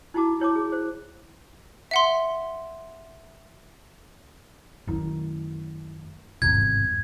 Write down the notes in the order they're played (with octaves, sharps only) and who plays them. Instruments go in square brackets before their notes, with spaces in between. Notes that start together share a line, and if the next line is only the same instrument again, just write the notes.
[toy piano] D#4 E4 F#4 A5 D6
E4 C#5 A5 D6
G#4
C5
[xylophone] E5 F#5 C6
[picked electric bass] F#2 D#3 [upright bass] A3 E4
[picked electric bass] G#1 C3 [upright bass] E2 G2 [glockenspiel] G#6